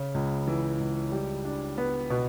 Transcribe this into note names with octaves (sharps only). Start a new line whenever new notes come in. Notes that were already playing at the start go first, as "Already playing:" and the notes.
Already playing: C#3
C#2
E3
C#2
G3
D4
B3
B2